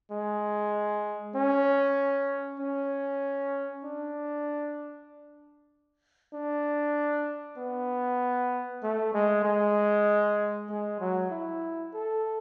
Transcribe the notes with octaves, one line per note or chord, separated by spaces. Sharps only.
G#3
C#4
C#4
D4
D4
B3
A3
G#3
G#3
G#3
F#3
E4
A4